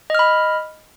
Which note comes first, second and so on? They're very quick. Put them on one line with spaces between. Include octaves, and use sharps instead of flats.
D#5 F6 B5